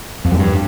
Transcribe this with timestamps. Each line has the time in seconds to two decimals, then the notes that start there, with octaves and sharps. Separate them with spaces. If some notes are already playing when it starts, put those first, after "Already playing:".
0.24 F2
0.31 F#3
0.38 G2